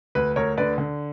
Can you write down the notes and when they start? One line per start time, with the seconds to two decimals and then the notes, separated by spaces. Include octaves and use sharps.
0.15 D2 B4
0.36 D2 A#4 C#5
0.57 D3 B4 D5
0.78 D3